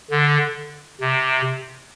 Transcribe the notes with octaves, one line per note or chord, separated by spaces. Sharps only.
D3
C3